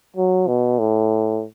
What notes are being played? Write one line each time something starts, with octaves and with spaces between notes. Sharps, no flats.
F#3
B2
A2